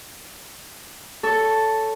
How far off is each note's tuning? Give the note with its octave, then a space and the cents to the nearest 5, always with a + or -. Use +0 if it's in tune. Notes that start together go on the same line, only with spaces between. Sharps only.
A4 +0 C#5 +25 C#6 +0